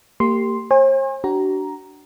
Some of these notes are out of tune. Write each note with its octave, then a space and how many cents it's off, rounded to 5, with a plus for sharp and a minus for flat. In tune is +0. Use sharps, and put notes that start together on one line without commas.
A#3 -30 G4 +0 C6 +0
C5 +45 G#5 -35
D4 +0 F#4 +40 A#5 +5